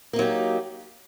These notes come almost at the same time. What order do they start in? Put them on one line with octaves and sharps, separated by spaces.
A#3 D#4 F#3 G4